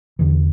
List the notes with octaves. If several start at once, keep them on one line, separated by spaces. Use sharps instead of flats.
E2 D3 E3